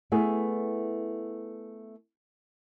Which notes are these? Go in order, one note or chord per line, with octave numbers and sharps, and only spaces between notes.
A3 B3 E4 G#4